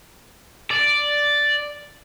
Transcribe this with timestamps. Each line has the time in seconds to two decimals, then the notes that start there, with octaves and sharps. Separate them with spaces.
0.71 D5